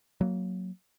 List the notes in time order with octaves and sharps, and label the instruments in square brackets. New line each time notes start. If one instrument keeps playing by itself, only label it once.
[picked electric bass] F#3 A#3